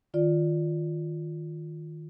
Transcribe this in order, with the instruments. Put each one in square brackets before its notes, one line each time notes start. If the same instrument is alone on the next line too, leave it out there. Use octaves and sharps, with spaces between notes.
[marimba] D#3 F4 D5